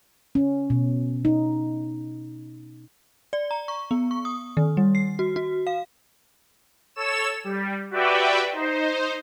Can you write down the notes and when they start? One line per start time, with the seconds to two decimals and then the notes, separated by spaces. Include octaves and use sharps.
0.35 C#4
0.70 B2
1.25 D#4
3.33 D5
3.51 A#5
3.68 C#6
3.91 B3
4.11 C#6
4.25 D#6
4.57 D#3
4.77 G3
4.95 C7
5.19 F#4
5.36 F#4
5.67 F5
6.96 A4 C#5 E6 E7
7.44 G3
7.91 F#4 G4 B4 D5 E5 G5
8.52 D#4 C5